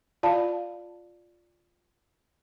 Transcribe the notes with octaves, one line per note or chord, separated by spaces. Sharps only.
F4 D5 F5 A5 B5